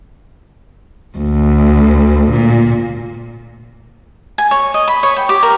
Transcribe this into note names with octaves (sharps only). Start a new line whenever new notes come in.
D2
A#2
G#5
C#5
D#5
B5
C#5
G5
G4
A#4